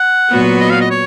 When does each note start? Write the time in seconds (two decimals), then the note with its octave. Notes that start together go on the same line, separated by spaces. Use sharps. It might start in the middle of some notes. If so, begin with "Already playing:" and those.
Already playing: F#5
0.31 A#2 F#3 B3 F#4 B4
0.60 D#5
0.70 F5
0.81 D#5
0.90 C#5